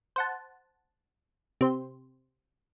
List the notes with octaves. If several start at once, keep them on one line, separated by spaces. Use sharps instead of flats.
C5 F#5 A5
C3 C5